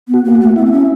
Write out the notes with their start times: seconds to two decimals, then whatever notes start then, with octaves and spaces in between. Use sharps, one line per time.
0.08 B3
0.14 F#4
0.24 A#3
0.35 F#4
0.40 A3
0.56 B3 E4
0.66 C4
0.72 C#4